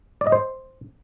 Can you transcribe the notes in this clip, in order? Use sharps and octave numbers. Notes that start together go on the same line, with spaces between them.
D5
D#5
C5